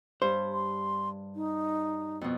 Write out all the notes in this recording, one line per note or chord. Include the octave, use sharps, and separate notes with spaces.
G2 C5
C6
D#4
F2 B2